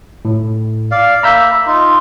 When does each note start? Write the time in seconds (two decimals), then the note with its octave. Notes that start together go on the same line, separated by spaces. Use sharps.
0.25 A2
0.91 D5 F5
1.23 A#3 E5 A#5 B5 E6 G6
1.67 D#4 F4